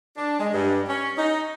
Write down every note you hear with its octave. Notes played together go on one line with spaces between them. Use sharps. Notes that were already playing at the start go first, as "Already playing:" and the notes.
D4
G#3
G2
C#4
D#4